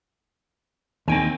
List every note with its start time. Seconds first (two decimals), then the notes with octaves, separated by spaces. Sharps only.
1.08 D#2 D#3 C4 G5 G#5